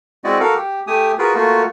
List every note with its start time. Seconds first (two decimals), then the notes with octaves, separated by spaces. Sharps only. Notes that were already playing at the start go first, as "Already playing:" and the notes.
0.24 G#3 C4 E4 F#4 D5 D#5
0.40 F#4 A4 A#4 F5
0.56 G4
0.87 A3 G4 G#5 D#6
1.19 F4 F#4 G#4 A#4 B4
1.35 A3 A#3 F4 F#4